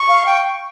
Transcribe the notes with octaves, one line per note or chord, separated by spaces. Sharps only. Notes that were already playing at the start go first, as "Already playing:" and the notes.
Already playing: C#6
F5
G5